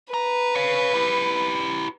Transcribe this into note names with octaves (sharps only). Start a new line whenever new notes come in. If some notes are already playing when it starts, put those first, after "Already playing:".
B4 A#5
C#5 F5
E4 G4